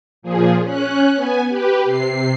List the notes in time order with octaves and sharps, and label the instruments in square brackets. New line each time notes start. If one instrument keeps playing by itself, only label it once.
[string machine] A#2 F3 G#4
C#4 F#6
B3 G#5
G4 B4
C3 C7